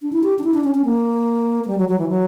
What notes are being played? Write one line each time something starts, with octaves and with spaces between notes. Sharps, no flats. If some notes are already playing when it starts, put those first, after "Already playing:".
D4
E4
G4
D4
E4
D4
C#4
C#4
A#3
A#3
G3
F#3
F#3
E3
F#3